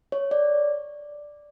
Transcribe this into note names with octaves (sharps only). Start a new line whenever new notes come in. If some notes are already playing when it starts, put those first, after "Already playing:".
C#5
D5